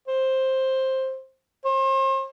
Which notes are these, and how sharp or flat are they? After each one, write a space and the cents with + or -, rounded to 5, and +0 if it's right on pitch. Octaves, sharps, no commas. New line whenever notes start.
C5 +10
C5 +40